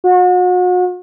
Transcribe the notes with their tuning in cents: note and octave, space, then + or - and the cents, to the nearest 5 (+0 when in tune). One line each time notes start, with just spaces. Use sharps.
F#4 -40